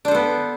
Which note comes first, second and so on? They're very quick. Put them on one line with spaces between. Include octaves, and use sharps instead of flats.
D4 C5 A4 B3